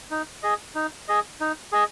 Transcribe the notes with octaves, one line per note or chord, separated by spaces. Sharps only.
D#4
G#4 D#5
D#4
G#4 D#5
D#4
G#4 D#5